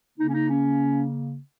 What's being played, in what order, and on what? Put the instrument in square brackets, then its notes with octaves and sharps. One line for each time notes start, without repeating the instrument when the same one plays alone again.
[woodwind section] C#3 A#3 D#4
C#4
D#4
C#4